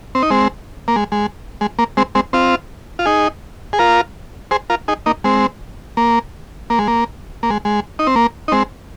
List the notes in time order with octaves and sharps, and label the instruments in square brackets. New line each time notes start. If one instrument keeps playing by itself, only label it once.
[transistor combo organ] C4
D#4
G#3 C4
A#3
G#3
G#3
G#3
A#3
G#3 C4
G#3 C4
C4 F4
F4
D#4 G#4
G#4
F4 A#4
G#4 C5
F4 A#4
D#4 G#4
A#3 D#4
G#3 C4
A#3
A#3
G#3
A#3
A#3
G#3
G#3
D#4
C4
A#3
D#4
G#3 C4